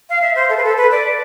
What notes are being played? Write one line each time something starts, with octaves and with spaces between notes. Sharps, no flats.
F5
E5
C5
A4
B4
A4
B4
D5